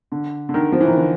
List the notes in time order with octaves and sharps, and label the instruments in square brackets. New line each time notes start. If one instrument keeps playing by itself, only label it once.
[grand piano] D3
D3
D#3
F3
E3
D#3
D3